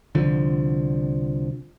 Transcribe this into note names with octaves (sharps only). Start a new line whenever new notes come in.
C2 D3 F3